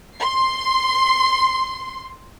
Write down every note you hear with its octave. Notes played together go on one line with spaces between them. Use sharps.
C6 C7